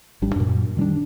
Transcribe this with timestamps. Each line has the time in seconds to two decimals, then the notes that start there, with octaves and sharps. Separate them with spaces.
0.22 G#1 G3 D4
0.36 F#2 A#2
0.77 D#3 G3 C#4 D4